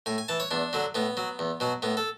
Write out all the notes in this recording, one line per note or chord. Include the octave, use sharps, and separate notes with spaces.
A2 G#5
G#5
E3 A5
C#5
E2 D4
D3 F#3
A2 B3
F#3
E2
B2 F#3
A2 B3
A4